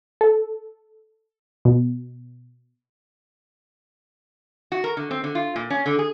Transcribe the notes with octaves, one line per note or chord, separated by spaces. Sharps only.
A4
B2
F#4
A#4
D3
C4
D3
F4
A#2
C#4
D3
G#4